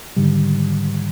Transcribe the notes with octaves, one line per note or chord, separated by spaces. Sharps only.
G#2 D3 D#3 G3